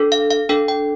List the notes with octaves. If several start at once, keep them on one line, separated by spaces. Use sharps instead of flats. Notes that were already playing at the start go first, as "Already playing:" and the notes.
Already playing: D4 A4
F5
F5
D4 A4 G5
G5